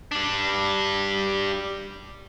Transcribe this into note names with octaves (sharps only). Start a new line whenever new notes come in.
G3 D4